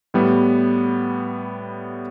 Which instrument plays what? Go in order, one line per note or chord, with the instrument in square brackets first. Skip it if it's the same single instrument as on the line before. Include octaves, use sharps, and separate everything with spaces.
[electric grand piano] A2 G3 B3